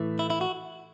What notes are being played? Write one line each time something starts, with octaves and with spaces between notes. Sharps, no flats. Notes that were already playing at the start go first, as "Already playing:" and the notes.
Already playing: A2 E3 A3
E4
E4
F#4